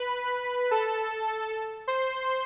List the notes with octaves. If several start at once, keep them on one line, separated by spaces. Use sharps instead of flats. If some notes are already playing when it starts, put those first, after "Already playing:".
Already playing: B4 B5
A4 A5
C5 C6